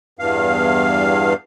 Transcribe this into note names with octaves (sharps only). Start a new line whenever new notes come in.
E2 G2 F5